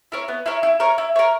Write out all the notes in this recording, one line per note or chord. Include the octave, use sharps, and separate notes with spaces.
E4 A#4 C#5
B3
E4 A#4 C#5
E4
A#4 C#5
E4
A#4 C#5